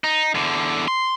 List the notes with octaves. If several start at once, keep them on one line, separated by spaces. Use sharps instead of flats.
D#4
E2 D3
C6